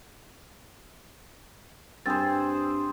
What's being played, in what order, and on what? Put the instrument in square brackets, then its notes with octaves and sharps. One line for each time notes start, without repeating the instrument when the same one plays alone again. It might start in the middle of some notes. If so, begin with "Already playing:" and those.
[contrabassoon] G2 [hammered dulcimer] C4 G#4 C5 [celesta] A6